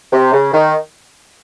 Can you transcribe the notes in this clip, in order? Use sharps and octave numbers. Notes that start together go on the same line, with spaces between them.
C3
C#3
D#3